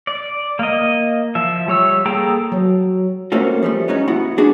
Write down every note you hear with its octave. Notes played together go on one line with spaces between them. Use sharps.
D5
A#3 D#5
F3 E5
G3 C#5 E6
A#3 G#4 A4 G5 A#5
F#3
A3 A#3 C4 C#4 F#4
F3 G3 A3
B3 C#4 D#4
B3 E4 F#4 F#5
G3 B3 D4 F#4 G#4 A4